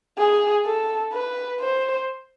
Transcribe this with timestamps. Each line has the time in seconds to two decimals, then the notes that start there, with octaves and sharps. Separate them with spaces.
0.18 G#4
0.65 A4
1.13 B4
1.60 C5